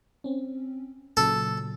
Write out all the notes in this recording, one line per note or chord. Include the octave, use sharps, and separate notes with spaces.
C4 C#4
A#2 C#3 F#3 A4